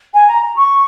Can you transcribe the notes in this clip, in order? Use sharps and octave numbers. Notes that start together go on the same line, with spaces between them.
G#5
A#5
A#5
C#6